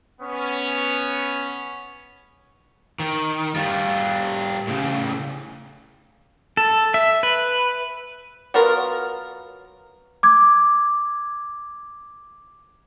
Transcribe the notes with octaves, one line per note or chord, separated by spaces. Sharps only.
B3 C#4
D#3
G3 F4
A2 C#3
A4
E5
B4
F#3 B3 F4 A#4
D6 G#6